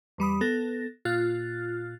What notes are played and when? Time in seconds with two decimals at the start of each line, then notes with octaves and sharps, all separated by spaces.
0.18 E2 G3 B5 D#6
0.41 B3 A4 A6 A#6
1.05 A#2 F4 F6 F#6 A6